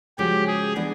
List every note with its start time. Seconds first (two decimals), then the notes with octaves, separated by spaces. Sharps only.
0.18 C#3 F3 G#3 C#4 F#4 G4
0.48 G#4
0.76 E3 G#3 B3 D4